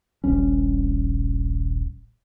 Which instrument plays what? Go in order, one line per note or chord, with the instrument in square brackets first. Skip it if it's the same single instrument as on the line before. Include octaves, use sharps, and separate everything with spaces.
[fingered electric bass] D#1 A#1 G3 C#4